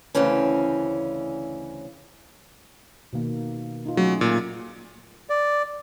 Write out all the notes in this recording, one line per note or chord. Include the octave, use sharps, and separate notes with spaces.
D2 C#3 E3 C4 C#4
B2 D#3 A#3
D#4 F4
F#3 A3 C#4 G#4
A#2
D5